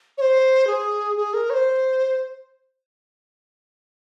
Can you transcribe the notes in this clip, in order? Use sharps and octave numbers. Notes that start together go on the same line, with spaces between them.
C#5
C5
G#4
G#4
A#4
C#5
C5